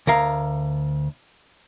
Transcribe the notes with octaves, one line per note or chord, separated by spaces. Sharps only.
D2 A#4 F5